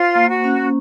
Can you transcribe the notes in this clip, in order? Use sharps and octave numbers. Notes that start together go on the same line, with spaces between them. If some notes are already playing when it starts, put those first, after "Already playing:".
Already playing: F4 C5
A#3
F#4
C#4